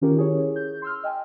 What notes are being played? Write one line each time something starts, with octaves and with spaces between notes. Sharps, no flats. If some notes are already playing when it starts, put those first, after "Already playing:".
D#3 C#4 F4 G4 A#4
E4 G#4 C#5
G6
C6 E6 F6
D#5 G5 G#5